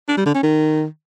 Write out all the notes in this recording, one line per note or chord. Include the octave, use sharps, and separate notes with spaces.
D4
G3
D3
C#4
D#3